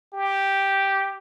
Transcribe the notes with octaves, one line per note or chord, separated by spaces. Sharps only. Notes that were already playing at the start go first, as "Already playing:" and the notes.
G4